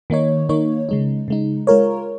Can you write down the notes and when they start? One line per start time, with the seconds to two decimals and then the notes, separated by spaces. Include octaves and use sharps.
0.10 D#3 A#3 D#4 C#5
0.49 D#3 A#3 D#4 C#5
0.89 C#3 G#3 D#4
1.28 C#3 G#3 D#4
1.67 G#3 F4 A#4 C#5